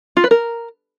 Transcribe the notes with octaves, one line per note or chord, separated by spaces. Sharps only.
F4
B4
A#4